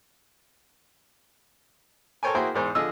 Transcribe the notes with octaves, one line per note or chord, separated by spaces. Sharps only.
A4 A#4 C5 C#5 G5 G#5
A#3 E4 F#4 G#4 C5 G5
E2 G#2 C5
D3 F3 F4 G#4 D#5 E6